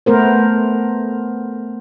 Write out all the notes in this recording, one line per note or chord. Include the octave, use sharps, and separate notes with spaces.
A3 B3 A#4 C5